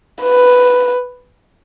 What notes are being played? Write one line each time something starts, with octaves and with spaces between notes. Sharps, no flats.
B4